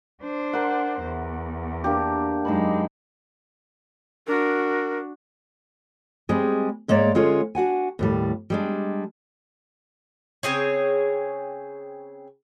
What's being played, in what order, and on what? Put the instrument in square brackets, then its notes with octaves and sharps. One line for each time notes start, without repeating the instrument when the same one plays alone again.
[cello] D4 C5
[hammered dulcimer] A#4 F#5
[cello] E2
[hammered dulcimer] A#3 D4 G4
[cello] F#2 G#3 [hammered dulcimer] D#4 A5 B5
[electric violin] D4 F#4 [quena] A#4
[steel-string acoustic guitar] G3 G#3 C4 G#4
G#2 G#3 A#3 C#5 D5 A#5
D3 G#3 C#4 F4 G#4 C#5
D4 F#4 F#5 G#5
D#2 A2 G3
G3 G#3 D4
[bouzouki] C#3 C4 G#4 C#5